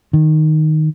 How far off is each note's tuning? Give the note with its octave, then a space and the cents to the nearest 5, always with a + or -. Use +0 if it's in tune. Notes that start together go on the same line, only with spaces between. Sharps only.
D#3 -5